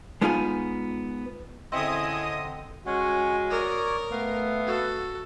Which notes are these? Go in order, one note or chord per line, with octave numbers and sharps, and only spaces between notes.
G#3 B3 D#4 F4 G5 G#5
D3 C4 C#4 E4 G#4 D#5 D#6
G#3 C#4 F#4 C#5 F#5
A#4 C#5 D5 D#6
A3 B3 F5
F#4 A4